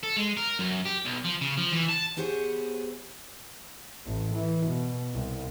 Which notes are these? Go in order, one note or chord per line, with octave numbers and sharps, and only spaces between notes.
A4
G#3
A#4
F#2
G4
B1
F3
C#3
F3
E3
A5
B3 G4 G#4 C5 C#5
A1
E3
B2
C2